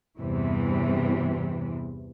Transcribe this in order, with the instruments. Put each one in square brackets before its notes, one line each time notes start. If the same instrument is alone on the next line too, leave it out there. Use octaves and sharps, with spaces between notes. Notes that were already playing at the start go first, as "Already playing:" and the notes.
[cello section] E2 G2 C3 E3